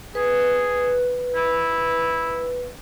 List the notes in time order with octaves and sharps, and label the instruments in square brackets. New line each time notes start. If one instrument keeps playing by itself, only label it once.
[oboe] G#4 [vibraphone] B4
[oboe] E4